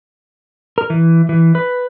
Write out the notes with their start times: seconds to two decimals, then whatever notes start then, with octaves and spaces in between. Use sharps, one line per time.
0.78 A#4
0.90 E3
1.29 E3
1.55 B4